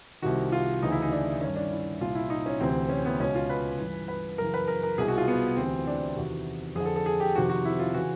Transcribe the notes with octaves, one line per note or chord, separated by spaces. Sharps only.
C2 C3 D#3 F#4
F4
D2 C#3 E3 D#4
E4
D#4
D4
D#3 C#4
G2
D4
E4
C2 A#2 F4
E4
D#4
C#4
D2 C3 E3 C4
C#4
B3
C#2 B2 C#4
F4
B4
G2 E3
B4
F#2 C#3 E3 A#4
B4
A#4
A#4
C2 B2 G#4
F#4
F4
B3
D2 C3 E3 C4
D4
E2 C3 D#3 F#4
F2 D3 G#4
A4
A4
G#4
G4
F2 C3 D#3 F#4
F#4
E4
F4
C#3 E3 F#4